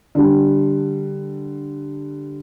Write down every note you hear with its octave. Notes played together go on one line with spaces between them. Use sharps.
D3 G3